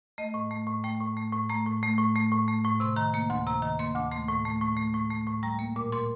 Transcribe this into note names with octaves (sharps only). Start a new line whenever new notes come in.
A3 D#5
A2
A3
A2
A3 G5
A2
A3
A2
A3 A#5
A2
A3
A2
A3
A2
A3
A2
C3 C6
D#3 A#5
A#3 A#5
D2 C6
C3 A#5
D#3 A#5
A#3 C6
D2 D6
A3 C6
A2
A3
A2
A3
A2
A3
A2
G3 A#5
A#3
A#2 D6
A#2 C6